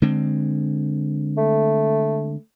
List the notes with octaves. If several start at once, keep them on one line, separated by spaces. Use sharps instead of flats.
D3 G#3 C4
A3